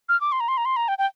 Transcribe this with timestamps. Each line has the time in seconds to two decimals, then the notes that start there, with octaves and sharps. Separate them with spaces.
0.09 F6
0.21 D6
0.32 C6
0.40 A#5
0.48 C6
0.57 A#5
0.65 C6
0.76 A#5
0.88 G5
0.98 G5